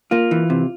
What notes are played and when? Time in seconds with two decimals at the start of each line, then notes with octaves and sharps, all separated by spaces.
0.11 A#3 F4
0.31 E3
0.50 C3